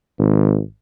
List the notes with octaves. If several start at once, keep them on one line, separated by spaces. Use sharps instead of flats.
G#1